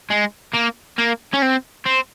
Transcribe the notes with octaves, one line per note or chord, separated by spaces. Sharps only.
G#3
A#3
A#3
C#4
C4
C4